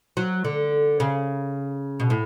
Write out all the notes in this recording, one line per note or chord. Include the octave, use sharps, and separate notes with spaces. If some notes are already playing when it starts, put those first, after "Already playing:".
F#3
D3
C#3
B2
A2